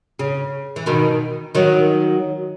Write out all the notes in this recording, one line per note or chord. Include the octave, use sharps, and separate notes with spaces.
C#3
E3
B2 D#3
D#3 F#3